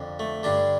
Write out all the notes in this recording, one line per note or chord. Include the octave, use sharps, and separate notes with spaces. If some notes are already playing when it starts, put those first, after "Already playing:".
Already playing: F2 D3
A3
G2 D3 D4